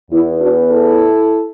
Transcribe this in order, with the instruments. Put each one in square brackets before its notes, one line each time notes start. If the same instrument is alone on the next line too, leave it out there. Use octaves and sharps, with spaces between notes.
[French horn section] E2 E3 B3 E4
D4 F#4
E4 A4